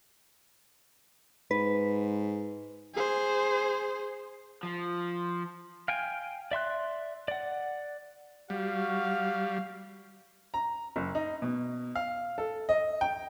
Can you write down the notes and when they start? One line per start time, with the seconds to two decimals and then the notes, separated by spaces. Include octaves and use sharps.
1.51 G#2 B4
2.94 G#4 C5
4.63 F3
5.88 F5 G5 G#5
6.51 D5 E5 C6 F#6
7.28 D5 F#5
8.50 G3 F#4 F5
10.54 A#5
10.96 F#1
11.15 D#4
11.42 B2
11.95 F5
12.38 A4
12.69 D#5
13.01 G5